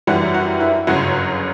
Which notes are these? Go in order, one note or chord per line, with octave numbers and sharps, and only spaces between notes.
F#2 E3 G3 F#4
F#4
E4
G1 F#2 C#3 F#3 F#4